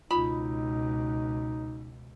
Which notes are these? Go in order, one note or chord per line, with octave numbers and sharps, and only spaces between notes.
C#2 B2 D#4 F4 B5